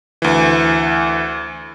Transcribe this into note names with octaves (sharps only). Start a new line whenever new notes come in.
D2 E3